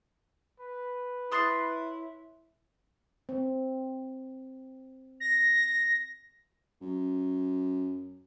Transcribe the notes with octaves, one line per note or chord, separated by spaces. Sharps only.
B4
E4 C#5 C6 D#6 F#6 A6 C7
C4
A#6
F#2